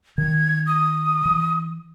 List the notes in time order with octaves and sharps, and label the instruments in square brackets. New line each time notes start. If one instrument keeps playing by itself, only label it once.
[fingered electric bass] D#3 [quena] G#6
[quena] D#6
[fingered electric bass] E3